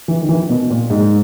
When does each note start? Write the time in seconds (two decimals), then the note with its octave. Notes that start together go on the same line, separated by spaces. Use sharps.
0.08 E3
0.21 D#3
0.29 E3
0.49 B2
0.70 A#2
0.90 G#2